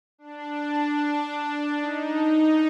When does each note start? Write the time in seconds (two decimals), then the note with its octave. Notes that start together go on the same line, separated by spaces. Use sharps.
0.18 D4
1.79 D#4
2.18 D#4